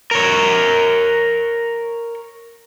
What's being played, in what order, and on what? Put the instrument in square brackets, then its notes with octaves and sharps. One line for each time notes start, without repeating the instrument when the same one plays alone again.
[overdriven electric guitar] A#4 C#5